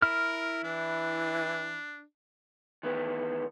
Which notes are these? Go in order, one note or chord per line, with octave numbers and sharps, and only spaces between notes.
E4 A#4 F6
E3 D4
D#3 E3 B3